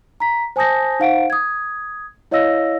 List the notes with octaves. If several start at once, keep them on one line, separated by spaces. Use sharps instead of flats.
A#5 B6
C5 G#5 A5 D#6 G6 A#6
D#4 C5 F5 F#5 D7
D#6 G#6
E4 C#5 D#5 F5 E6 A#6